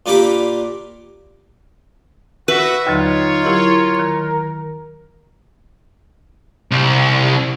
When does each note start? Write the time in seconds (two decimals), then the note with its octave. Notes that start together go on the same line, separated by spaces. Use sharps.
0.06 A#2 A#3 D4 G4 B5 D6
2.48 F#4 B4 E5
2.87 D#2 D3 F#3 D#4 F4 C#5
3.45 F#3 E4 G4 A#4
3.95 D#3 G#6
6.71 C2